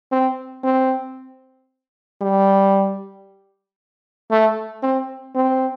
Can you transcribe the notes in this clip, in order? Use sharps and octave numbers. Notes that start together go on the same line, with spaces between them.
C4
C4
G3
A3
C4
C4